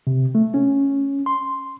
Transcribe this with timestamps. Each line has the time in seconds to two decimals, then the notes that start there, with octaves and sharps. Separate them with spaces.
0.07 C3
0.35 A3
0.54 C#4
1.26 C6